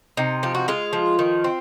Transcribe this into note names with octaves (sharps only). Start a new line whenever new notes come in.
C3 D#4
F3 G4
F#4
G#3 F4
F3
D#3
C4